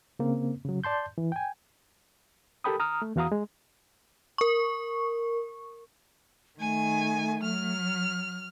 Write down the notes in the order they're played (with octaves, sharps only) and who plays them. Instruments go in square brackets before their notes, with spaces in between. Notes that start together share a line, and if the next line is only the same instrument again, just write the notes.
[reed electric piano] C#3 A#3 C4
C#3 F#3
D5 A5 C6 G6
E3
G5 G#5
G4 A4 A#4 G5 B5 D#6
A#5 D#6 F6
A3
E2 E3 F#4 F5 A#5 D#6
G#3
[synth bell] A#4 C#6
[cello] D#3 [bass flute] A3 [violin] G#5
[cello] F#3 [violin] F6